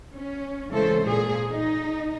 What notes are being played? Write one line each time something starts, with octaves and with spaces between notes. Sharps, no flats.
C#4
C#3 E3 G#3 A3 A4 C5
A#2 G#4
D#4